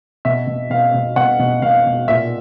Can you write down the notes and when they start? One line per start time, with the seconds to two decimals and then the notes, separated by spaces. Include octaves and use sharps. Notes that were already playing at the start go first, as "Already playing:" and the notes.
0.25 B2 E5
0.47 B2
0.70 B2 F5
0.94 B2
1.16 B2 F#5
1.39 B2
1.62 B2 F5
1.86 B2
2.08 A#2 E5